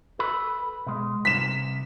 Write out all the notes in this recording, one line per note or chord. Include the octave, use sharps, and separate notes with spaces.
A4 B4 B5
B2 G#3
C2 B6 E7